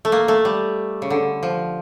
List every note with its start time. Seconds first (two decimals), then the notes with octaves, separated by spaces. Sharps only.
0.05 A3
0.12 A#3
0.28 A3
0.45 G3
1.02 C#3
1.10 D3
1.43 F3